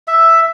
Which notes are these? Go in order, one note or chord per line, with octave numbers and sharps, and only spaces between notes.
E5